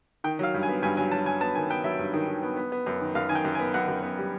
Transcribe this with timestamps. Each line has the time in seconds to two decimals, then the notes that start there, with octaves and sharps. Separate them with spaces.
0.24 D#3 G5
0.39 F#3 F5
0.54 G2
0.63 G#5
0.69 B3
0.83 G2 G#5
0.97 F#3 G#5
1.12 F#3 A5
1.26 F#3 G#5
1.41 B3 A5
1.55 D#3 G#5
1.70 B3 G5
1.84 F#3 E5
1.99 G2
2.13 D#3
2.28 D#3
2.43 B3
2.57 B3
2.72 B3
2.86 F#2
3.01 D#3
3.15 F#2 F5
3.29 D#3 G#5
3.35 G5
3.45 F#2
3.55 G#5
3.59 B3
3.74 F#2 F#5
3.88 F#2
4.03 B3
4.17 G3